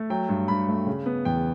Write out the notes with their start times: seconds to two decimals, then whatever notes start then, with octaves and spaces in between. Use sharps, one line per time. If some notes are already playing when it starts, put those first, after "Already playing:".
Already playing: A3
0.10 F#3 G5
0.29 G2
0.48 G2 B5
0.69 A3
0.87 C#3
1.06 B3
1.25 E2 G5